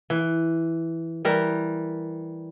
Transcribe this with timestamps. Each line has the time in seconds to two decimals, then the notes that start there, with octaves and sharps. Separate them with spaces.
0.10 E3
1.25 E3 G3 A#4